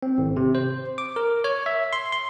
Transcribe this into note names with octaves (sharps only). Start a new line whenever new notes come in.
C4
G#1
C3
C5
D6
A#4
C#5
E5
C6
C6